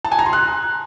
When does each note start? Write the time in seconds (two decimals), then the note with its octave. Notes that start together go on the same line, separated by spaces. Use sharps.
0.05 A5
0.12 G#5
0.19 A#5
0.26 C6
0.33 F#6